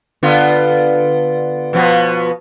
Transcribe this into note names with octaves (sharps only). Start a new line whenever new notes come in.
D3 B3 F4
B2 F3 B3